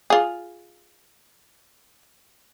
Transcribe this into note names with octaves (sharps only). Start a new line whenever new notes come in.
F4 G#4